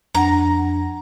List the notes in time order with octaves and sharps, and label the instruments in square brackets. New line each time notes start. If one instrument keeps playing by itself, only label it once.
[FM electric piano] F2 [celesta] D4 F#5 [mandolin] A#5